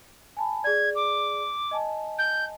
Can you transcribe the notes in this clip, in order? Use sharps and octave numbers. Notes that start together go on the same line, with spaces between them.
G#5 A5 B5
G#4 D5 G#6
D6
D#5 G#5 A5
G6